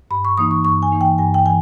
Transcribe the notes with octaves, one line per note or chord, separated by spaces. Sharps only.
G2 B5
C#6
E3 A#3 D#4 D#6
C#6
G2 C#6
G#5
E3 A#3 D#4
G5
G2 G#5
G5
E3 G#5